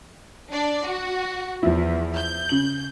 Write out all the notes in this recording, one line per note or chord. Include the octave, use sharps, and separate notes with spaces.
D4 D5
F#4
E2 F3 E4
G6
C#3 F#7